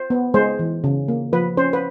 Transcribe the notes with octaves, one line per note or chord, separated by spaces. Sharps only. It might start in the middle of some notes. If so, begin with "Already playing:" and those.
Already playing: C5
B3
G#3 C5
E3
C#3
A#3
F3 B4
C#4 C5
B4